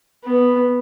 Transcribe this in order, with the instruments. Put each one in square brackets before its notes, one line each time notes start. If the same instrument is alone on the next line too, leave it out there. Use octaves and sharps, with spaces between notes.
[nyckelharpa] B3